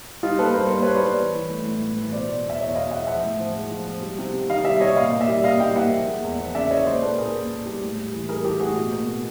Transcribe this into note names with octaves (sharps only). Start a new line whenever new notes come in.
G3 D#4 F4
A#3 A4 B4
G2 A#4 C5
A#3 A#4 C5
G3 B4 C#5
C5 D5
G3 B4 C#5
E3
E3
A3
A2
A2
E3
B2 C5 D5
B2
E2
E5
E2 C#5 D#5
B2 D#5 F5
G#3 E5 F#5
F3 E5 F#5
A2
F3
G#3
F3
F3
G3
C3
C3
D#3 D#5 F5
G3 D5 E5
C3 C#5 D#5
A#2 D#5 F5
A#3
D5 E5
G3
A#3 D#5 F5
G3 F5 G5
A#3 E5 F#5
F3
G#3
E2
F3
C#3 D5 E5
G#3 C#5 D#5
A#3 C5 D5
A#2 A4 B4
A#2 G#4 A#4
A#2
A#2
G3
A2
G3
E3
G3 G#4 A#4
E3 G4 A4
A2 F#4 G#4
B2
A#3
B2